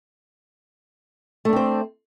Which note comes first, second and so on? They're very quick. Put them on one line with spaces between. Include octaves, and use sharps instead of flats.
A3 D4 C4 C5